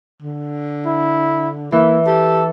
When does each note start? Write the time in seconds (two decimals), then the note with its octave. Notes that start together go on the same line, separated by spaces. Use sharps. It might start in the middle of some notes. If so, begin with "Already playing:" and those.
0.22 D3
0.86 E4
1.72 E3 A#3 E4
2.06 G4 A4